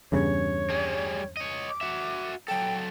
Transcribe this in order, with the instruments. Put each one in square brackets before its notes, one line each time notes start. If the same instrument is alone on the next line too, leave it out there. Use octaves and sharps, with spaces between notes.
[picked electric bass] E2 G2 C#3 [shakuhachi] C#5
[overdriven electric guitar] G3 G#4
C#5 D#5
[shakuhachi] D6
[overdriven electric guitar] F#4 E5
[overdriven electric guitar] F#3 A4 [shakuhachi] G5